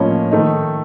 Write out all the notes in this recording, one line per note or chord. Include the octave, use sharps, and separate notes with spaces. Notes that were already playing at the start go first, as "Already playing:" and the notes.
Already playing: A2 F3 A#3 C#4 C#5 D#5
D#3 A3 D#4